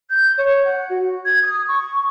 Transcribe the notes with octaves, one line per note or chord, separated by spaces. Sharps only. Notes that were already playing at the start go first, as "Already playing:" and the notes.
G6
C#5
F#5
F#4
G#6
D#6
C#6